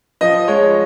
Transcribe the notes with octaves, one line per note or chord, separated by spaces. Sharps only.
F3 D#5
G#3 C#5